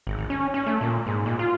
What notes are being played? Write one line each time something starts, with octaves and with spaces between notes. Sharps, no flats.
G#1
G#1
C#4
C#4
A3
A#2
G#2
A#2
F4